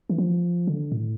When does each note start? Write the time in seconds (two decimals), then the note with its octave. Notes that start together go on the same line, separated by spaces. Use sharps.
0.10 E3
0.18 F3
0.67 D3
0.92 A2